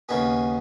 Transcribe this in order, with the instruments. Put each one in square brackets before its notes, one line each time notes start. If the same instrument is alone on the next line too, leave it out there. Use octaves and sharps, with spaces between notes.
[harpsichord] D#2 C#3 B3 G#4